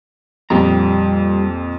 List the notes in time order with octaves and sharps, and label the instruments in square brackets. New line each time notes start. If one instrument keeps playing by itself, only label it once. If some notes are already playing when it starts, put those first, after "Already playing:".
[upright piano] F2 A#2 [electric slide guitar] G3 G4 A#5